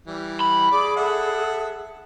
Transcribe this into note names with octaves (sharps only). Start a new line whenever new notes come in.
E3 G3
B5
G#4 D5 D6
A4 E5 F#5